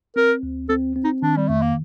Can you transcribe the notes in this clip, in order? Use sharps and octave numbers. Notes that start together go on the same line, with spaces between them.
C4 A#4
D2
C4 A4
C4
D#4
D#3 D4
G3
F2 A3
A#3